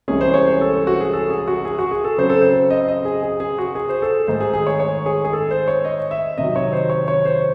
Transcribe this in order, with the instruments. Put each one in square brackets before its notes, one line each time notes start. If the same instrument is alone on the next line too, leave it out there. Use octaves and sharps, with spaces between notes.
[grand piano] C2 C3 E3 G#3 C#4 G#4
C5
C#5
C5
A4
F#4
G#4
A4
G#4
F#4
G#4
F#4
G#4
A4
C#3 F#3 C4 C5
A4
C5
D#5
D#5
G#4
G#4
G#4
F#4
G#4
C5
A4
G#2 D#3 A3 D#4 C5
G#4
G#4
C#5
C#5
G#4
G#4
A4
C5
C#5
D#5
E5
C3 D#3 F#3 D#5
C#5
C5
C#5
C#5
C5